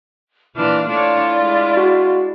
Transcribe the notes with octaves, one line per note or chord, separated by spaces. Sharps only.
A#2 E3 D4 F4 E5 F6
A3 D4 E4 F4 C#5 D5
G#3 D4
F#4